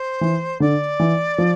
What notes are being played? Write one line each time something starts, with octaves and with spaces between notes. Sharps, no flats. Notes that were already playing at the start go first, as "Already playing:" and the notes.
Already playing: C5
E3
D3 D5
E3
F3